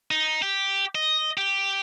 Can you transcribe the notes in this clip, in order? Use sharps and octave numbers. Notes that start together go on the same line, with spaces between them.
D#4
G4
D#5
G4